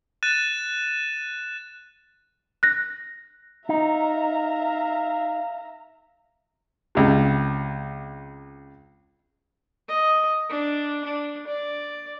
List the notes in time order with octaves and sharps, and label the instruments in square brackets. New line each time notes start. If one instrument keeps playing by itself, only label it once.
[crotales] F#6 A6 D#7 E7
[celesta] F#6 A#6
[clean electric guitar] D#4 [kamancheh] E5 A#5 [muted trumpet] F5
[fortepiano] C#2 C3
[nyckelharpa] D#5
D4
D4
D5